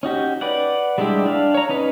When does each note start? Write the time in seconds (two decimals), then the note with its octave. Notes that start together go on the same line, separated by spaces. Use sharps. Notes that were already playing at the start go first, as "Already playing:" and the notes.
0.03 C#4 D#4 F#4 G4
0.41 B4 D5 F#5
0.98 G3 G#3 D4 E4 G4
1.26 D4 F5
1.54 C#5 A#5
1.69 C#4 D#4 B4